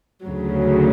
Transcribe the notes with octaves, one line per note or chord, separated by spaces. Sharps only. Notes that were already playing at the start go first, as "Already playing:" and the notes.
D2 C#3 F#3